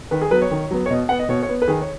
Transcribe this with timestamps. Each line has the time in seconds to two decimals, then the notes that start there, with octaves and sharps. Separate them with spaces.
0.11 D#3 B4
0.22 G#4
0.31 F#3 B3 B4
0.42 C#5
0.51 D#3
0.71 F#3 B3
0.86 C#5
0.90 B2 D#5
1.09 B3 F#5
1.19 D#5
1.29 B2 C#5
1.43 C#5
1.49 B3
1.62 B4
1.68 D#3 G#4
1.82 C#5